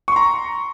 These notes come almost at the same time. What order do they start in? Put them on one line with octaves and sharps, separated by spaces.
C#6 C6 A#5